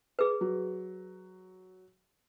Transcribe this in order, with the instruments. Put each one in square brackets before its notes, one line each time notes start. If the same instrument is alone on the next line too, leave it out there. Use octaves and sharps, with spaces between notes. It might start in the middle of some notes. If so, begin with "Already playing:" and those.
[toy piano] G#4 B4
[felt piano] F#3